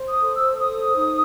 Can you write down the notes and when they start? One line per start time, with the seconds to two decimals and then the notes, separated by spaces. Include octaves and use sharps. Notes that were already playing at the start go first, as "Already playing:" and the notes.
Already playing: C5
0.09 D#6
0.21 A4
0.34 E6
0.58 C5 D#6
0.95 D#4